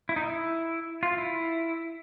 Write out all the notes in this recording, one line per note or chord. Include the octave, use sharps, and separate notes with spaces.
E4
D#4
E4
F4
E4